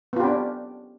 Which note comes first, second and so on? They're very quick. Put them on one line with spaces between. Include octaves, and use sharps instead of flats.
B3 F4 G4 C#4 D4